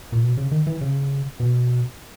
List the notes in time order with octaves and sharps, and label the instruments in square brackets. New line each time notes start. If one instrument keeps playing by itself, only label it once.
[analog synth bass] A#2
B2
C#3
D#3
E3
C#3
B2